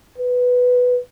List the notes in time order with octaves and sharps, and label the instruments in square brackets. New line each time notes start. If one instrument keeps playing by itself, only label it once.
[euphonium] B4